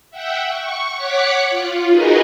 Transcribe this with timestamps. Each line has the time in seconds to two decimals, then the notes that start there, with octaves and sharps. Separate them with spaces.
0.11 E5 F#5 G5
0.49 C#6
0.96 C#5 F#5 D6 F#6 B6 C#7
1.50 F4
1.89 D#4 F#4 G#4 A#4 B4 D#5